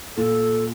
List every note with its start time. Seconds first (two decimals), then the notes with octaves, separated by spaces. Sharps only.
0.17 A#2 A4